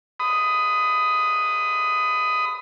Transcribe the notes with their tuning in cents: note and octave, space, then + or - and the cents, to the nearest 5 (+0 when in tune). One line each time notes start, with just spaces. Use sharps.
B5 +30 D#6 +0